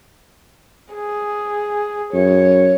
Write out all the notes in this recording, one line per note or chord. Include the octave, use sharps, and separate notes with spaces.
G#4
F#2 C#5